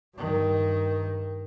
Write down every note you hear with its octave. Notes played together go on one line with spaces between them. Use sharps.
G2 D#3